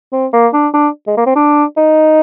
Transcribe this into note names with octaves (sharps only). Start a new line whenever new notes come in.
C4
A#3
D4
D4
G#3
A#3
C4
D4
D#4